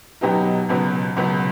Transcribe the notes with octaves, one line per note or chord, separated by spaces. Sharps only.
B2 F#3 B3 D#4 G4
C#2 B2 F#3 B3
C#2 B2 F#3 B3